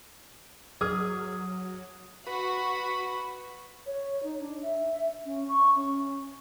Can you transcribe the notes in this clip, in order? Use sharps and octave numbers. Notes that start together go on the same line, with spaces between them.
F#3 G#4 D#6 F6 G#6
F#4 B4 B5
C#5
D#4
D4
E5
C#4
C#6
C#4